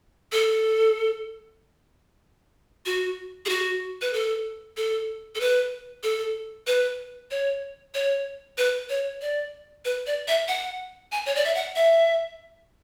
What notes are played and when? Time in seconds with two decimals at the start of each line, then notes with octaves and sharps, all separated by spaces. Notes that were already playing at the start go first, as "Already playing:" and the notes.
0.32 A4
2.86 F#4
3.46 G#4
3.49 F#4
4.01 B4
4.13 A4
4.77 A4
5.35 A4
5.40 B4
6.03 A4
6.67 B4
7.31 C#5
7.94 C#5
8.58 B4
8.89 C#5
9.21 D5
9.85 B4
10.07 D5
10.28 E5
10.48 F#5
11.12 G#5
11.26 C#5
11.35 D5
11.45 E5
11.55 F#5
11.76 E5